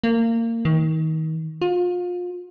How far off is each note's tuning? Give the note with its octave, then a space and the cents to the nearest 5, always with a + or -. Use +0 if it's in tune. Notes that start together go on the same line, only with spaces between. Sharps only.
A#3 -25
D#3 +30
F4 +30